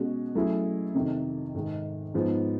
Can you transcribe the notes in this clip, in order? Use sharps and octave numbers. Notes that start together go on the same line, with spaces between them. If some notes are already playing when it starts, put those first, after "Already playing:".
Already playing: B2 G#3 C#4 F#4
F#3 A3 C#4 E4 G#4
F2 C3 D#3
G#2 D#3 G#3
G#2 F3 G#3 B3 D#4